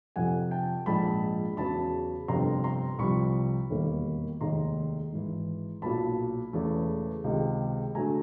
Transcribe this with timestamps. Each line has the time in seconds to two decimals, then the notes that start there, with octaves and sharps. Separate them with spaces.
0.16 F2 C3 F3 F#5 G#5
0.51 G5 A5
0.86 A#1 G#2 F3 G#3 A5 B5
1.57 E2 C#3 F#3 A5 B5
2.28 G1 F2 C3 A#5 C6
2.64 A#5 C6
2.99 C2 C3 F3 B5 C#6
3.70 E1 D#2 D#3 G3 A#3
4.41 F1 D#2 D#3 G#3 A#5 C6
5.12 G#1 G#2 E3
5.82 B1 A#2 F#3 A5 B5
6.53 E1 E2 C#3 E3 A3
7.24 C#2 C3 D#3 G#3
7.95 D3 F#3 A3 G#5 A#5